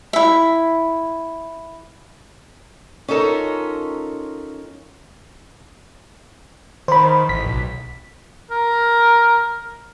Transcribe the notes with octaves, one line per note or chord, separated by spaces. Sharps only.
E4 E5
C#4 D#4 F4 A4 A#4
D#3 C5 B5
A1 B6
B1
A#4